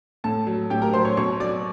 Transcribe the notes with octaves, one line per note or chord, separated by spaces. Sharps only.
A2 A4 A5
F#3
A2 G4 G5
A#4 A#5
F#3 C5 C6
C#5 C#6
B2 C#5 C#6
F#3 D5 D6